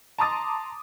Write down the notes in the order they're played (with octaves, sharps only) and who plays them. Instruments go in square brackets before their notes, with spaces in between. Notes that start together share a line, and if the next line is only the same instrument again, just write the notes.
[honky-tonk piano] A5 A#5 C6 D6 D#6 A6